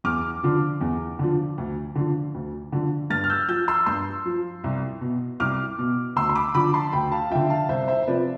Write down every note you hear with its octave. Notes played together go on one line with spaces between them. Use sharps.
E2 D6 F6
D3 F3
E2
D3 F3
D2
D3 F3
D2
D3 F3
G2 F6 A6
F6
E6 G6
F3 E6 G6
C6 E6
G2 C6 E6
F3
C2
B2
C2 D6 F6
B2
D2 C6 E6
C6
B5 D6
D3 F3 B5 D6
A5 C6
D2 G5 B5
F5 A5
D3 F3 E5 G5
F5 A5
C2 C5 E5
C5 E5
E5
C3 F3 B4 D5